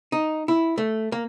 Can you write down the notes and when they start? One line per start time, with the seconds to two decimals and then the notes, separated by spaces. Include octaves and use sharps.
0.12 D#4
0.48 E4
0.78 A3
1.12 A#3